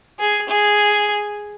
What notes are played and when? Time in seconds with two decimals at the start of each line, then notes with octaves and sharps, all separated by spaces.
0.20 G#4
0.49 G#4